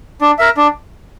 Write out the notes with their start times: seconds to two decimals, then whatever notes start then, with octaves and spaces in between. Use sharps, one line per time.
0.21 D4
0.39 A#4 E5
0.57 D4